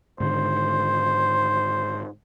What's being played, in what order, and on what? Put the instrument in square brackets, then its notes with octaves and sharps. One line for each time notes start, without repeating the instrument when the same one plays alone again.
[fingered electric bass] G#2 D3 D#3 [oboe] C5